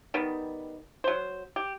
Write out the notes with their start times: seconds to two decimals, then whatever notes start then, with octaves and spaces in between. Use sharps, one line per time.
0.14 D#3 G3 B3
1.04 F#3 C5
1.56 G4